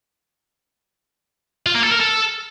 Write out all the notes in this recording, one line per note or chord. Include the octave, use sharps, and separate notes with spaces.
F4
A#3
A4
A#4
A4